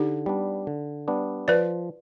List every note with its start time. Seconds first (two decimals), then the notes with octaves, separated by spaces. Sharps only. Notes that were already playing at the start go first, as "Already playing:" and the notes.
Already playing: D3 D#4 G4
0.26 G3 B3 D4
0.67 D3
1.08 G3 B3 D4
1.48 F3 B4 D5